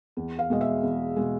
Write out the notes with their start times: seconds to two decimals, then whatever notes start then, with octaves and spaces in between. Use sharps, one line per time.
0.17 E2
0.39 F5
0.50 B2 G#3 D#5
0.61 E5
0.83 E2
1.16 B2 G#3